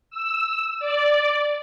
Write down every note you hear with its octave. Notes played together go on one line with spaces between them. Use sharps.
E6
D5